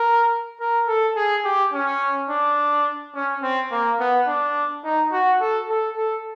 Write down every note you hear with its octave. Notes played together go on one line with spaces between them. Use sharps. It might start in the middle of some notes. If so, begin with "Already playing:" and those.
Already playing: A#4
A#4
A4
G#4
G4
C#4
D4
C#4
C4
A#3
B3
D4
D#4
F#4
A4
A4
A4